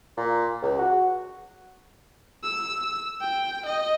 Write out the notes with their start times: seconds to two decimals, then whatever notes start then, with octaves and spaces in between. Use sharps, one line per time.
0.17 A#2
0.62 C#2
0.78 F#4
2.44 E6
3.21 G5
3.66 D#5